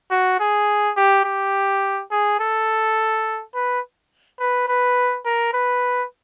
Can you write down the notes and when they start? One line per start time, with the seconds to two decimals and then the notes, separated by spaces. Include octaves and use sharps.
0.11 F#4
0.40 G#4
0.97 G4
1.25 G4
2.11 G#4
2.40 A4
3.54 B4
4.40 B4
4.68 B4
5.25 A#4
5.53 B4